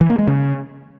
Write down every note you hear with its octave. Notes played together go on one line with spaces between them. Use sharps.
E3
A#3
G#3
C#3